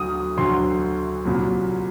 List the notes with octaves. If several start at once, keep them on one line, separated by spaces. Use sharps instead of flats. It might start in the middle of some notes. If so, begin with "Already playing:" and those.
Already playing: D2 D3 F#3 D#6
D2 D3 F#3 C6
C2 A#2 F#3